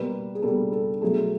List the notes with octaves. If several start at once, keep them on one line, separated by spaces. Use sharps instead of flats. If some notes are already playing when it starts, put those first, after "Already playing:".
Already playing: B2 G3 A#3 B4
G#4
B2 G3 A#3 A4
A4
B2 F#3 A3 G#4